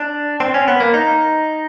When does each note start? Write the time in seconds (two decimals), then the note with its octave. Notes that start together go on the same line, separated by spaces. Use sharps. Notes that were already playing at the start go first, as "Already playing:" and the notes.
Already playing: D4
0.40 C4
0.54 C#4
0.68 B3
0.80 A#3
0.94 D#4